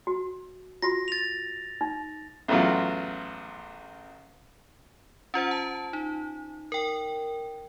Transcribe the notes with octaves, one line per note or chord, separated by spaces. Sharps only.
F#4
F4 F#4 A#6
A6 F7
D#4
A1 E2 F#3 F4
C#4 F4 C5 F#5
A5
D#4
A#4 G5